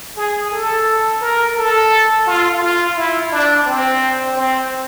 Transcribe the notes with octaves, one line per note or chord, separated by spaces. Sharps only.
G#4
A4
A#4
A4
F4
F4
E4
D4
C4
C4